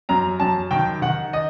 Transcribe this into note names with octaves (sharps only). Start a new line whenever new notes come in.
F#2 A#5
F#2 A5
D#3 G5
D#3 F#5
D#5